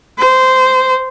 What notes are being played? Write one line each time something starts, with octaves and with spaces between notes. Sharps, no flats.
C5